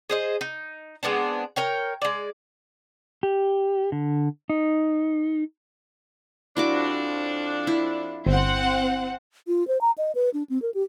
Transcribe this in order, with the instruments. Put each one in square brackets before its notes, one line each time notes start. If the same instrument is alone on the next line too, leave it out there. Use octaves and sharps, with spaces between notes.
[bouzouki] G#4 C5 D#5
D#4
G#3 B3 C4 D4
A#4 C#5 G5
G#3 D5
[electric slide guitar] G4
D3
D#4
[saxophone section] F2 F3 D4 [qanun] E4 F#4 D6
[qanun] E4
[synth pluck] G1 [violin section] C4 F#5
[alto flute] F4
C5
A#5
D#5
B4
D4
C4
A#4
G4